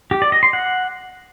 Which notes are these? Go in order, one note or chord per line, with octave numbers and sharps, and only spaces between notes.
G4
D5
D#5
C6
F#5